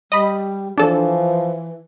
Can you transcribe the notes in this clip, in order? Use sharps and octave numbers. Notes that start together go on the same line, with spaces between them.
G3 D#5 B5
E3 F3 D4 A4